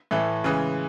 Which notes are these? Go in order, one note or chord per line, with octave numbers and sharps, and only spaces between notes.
A2 E3 A3
C#3 E3 G#3